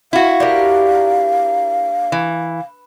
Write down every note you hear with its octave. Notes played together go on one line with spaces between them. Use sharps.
E4 F#4 F5
D4 G4 A#4
E3